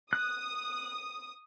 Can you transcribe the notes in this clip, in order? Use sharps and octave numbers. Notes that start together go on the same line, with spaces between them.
D#6 F#6